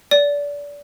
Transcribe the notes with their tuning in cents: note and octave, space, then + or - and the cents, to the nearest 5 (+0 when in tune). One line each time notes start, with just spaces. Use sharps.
D5 -25